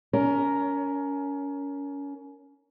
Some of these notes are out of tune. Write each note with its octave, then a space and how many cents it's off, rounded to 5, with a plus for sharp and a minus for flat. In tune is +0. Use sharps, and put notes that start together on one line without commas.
C#4 +25 A#4 +0